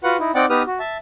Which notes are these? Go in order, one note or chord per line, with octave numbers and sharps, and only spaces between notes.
F4 F#4 B4 F#5
D#4 E4
C4 D#4 D5 F#5 G5 D6
B3 D#4 G4 B4 D#6 F6
F#4
E5 A5